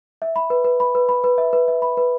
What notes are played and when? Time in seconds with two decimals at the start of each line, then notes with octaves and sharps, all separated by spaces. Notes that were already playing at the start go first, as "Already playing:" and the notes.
0.22 E5
0.36 B5
0.50 B4
0.64 B4
0.80 B5
0.95 B4
1.09 B5
1.24 B4
1.38 E5
1.53 B4
1.68 E5
1.82 B5
1.97 B4